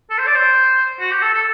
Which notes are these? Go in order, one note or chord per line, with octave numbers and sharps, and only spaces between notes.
A4
C5
D5
C5
F#4
G4
A4
A4